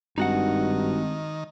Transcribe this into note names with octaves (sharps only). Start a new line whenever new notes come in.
G#1 G2 D#3 D#4 F#4 F#5